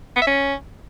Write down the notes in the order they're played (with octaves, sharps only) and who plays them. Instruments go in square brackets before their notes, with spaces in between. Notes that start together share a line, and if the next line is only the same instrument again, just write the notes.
[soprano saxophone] B3
E5
C#4